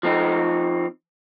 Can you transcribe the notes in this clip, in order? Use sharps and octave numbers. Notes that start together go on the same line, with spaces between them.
F3 C4 D#4